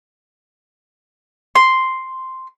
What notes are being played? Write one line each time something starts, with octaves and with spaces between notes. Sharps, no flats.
C6